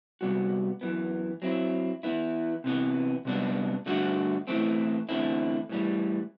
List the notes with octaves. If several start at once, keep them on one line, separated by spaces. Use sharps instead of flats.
C3 G3 B3 F#4
F#2 E3 B3
F#3 C4 E4
E3 B3 E4
C3 E3 B3
C3 G3 B3 D4
G2 D3 A3 D4 F#4
A2 E3 A3 C4
E2 D3 A3 C4 E4
A2 E3 G3